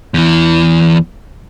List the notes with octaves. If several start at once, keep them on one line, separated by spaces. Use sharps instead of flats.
E2 E3